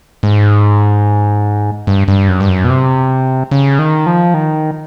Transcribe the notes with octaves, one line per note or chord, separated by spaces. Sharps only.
G#2
G2
G2
F#2
G2
F#2
B2
C3
C#3
D#3
F3
D#3